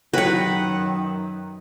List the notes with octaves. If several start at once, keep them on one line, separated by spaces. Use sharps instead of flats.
F#2 D#3 F#4 B4 C#5 F#5 G5